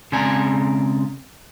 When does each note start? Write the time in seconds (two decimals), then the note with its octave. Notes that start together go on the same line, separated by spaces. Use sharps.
0.12 C#3 G#3 C4 D5 G#5 A#5